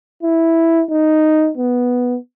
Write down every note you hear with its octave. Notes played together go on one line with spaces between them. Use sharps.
E4
D#4
B3